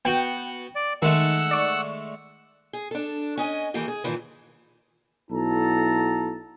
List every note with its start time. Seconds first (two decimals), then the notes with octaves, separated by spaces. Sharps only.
0.05 B3 F#4 G5
0.75 D5
1.02 D#3 G#3 A3 F#5 E6
1.51 D5 C#6
2.73 G#4
2.91 D4 A4
3.37 C#4 D#5 G#5
3.74 D#3 E3 A3 A#3 G4
3.88 G#4
4.04 G2 A#2 D#3 E3
5.31 B1 E4 F#4 A4 A5 A#5